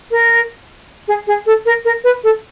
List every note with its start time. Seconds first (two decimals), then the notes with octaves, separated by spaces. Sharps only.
0.11 A#4
1.08 G#4
1.27 G#4
1.46 A4
1.66 A#4
1.85 A#4
2.04 B4
2.24 A4